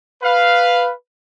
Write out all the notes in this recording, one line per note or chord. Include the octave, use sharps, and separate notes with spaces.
B4 F5